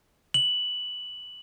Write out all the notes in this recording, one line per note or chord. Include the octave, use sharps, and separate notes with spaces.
F#7